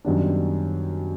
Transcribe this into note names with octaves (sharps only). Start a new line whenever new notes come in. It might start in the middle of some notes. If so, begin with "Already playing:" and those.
F#2 D#3 G3 B3 D4